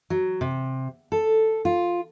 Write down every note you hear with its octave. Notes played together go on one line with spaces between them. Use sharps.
F#3
C3
A4
F4